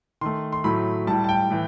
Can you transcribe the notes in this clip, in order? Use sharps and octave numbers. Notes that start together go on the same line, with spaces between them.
D#3 A3 C6
C6
A2 F#3 A3 B5
A2 G3 A5
A5
G5
A2 E3